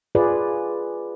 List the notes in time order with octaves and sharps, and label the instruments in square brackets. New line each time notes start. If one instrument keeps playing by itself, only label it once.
[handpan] F4 G#4 B4 D5